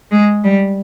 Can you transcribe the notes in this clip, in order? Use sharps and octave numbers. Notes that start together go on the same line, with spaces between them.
G#3
G3